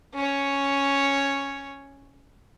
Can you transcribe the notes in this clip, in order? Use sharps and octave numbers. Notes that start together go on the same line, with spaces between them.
C#4 C#5